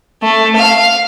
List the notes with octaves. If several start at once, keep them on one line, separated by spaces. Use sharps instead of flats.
A3
F5